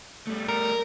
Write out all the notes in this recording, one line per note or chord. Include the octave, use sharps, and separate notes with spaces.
G3 A3
A#4